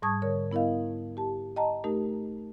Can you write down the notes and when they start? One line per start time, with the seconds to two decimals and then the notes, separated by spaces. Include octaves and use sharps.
0.02 G#2 G3 A5 C#6 D#6 G#6
0.22 D3 A#4 C#5
0.52 B3 E4 A#4 D#5 F5
1.17 G4 A5
1.56 D#5 G5 A5 A#5
1.84 A3 D#4 G4 A#4